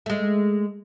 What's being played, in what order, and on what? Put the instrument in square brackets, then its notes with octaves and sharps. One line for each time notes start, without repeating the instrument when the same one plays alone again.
[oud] G#3 A3